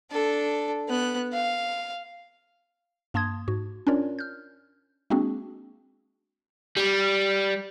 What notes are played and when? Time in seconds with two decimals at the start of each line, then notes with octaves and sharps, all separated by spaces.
0.11 D4 A4
0.88 B3 F#6
1.33 F5
3.14 G2 A#3 A5 C6 D#6 G#6
3.48 G#2 F#4
3.87 C#4 D4 F4 A#4 C#5 D5
4.19 F6 G6
5.10 G#3 A#3 C4 D4 F#4 G#4
6.77 G3